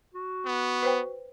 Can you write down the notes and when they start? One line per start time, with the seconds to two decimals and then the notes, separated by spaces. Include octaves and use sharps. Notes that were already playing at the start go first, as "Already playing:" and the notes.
0.14 F#4
0.46 B3
0.83 B4 C5 G5